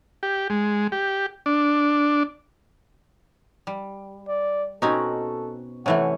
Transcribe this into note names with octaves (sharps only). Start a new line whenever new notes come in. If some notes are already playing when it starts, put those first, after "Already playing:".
G4
G#3
G4
D4
G3
D5
B2 C4 C#4 D#4 F#4 A4
C3 E3 A3 C#4 F#5